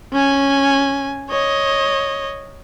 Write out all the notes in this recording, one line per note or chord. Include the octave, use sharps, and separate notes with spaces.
C#4 G#5
C#5 D#5